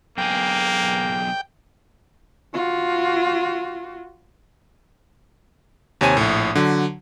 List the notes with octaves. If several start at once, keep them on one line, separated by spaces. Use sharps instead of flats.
B1 A#3 G#4 G5
F4 F#4
D#2 C3 C#5 G#5 D#7
A#1 A2
D3 F#3